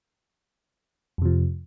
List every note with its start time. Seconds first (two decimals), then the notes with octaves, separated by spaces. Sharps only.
1.18 F2
1.22 C3
1.25 F3